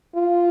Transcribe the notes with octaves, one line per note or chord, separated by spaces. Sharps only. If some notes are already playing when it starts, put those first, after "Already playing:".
F4